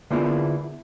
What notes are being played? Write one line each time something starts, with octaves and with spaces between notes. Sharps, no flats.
D3 A#3 B3 E4 F4 G#4